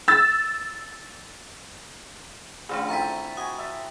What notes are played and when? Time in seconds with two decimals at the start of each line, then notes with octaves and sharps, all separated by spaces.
0.08 E6 A6
2.69 D#3 F3 A3 C#4 D4
2.89 A3 C4 E4 A#5 A6 B6
3.37 F#4 G#5 D#6
3.58 E5 A5